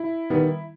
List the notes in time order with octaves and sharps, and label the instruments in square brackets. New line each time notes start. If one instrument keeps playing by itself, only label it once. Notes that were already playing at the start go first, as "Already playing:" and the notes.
Already playing: [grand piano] E4
D#3 G3 B3